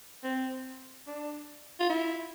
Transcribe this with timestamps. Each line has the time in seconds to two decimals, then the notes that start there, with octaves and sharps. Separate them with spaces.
0.24 C4
1.07 D4
1.80 F4
1.90 E4